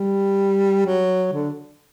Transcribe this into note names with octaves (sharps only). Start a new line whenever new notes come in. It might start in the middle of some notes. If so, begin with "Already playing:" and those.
Already playing: G3
F#3
D3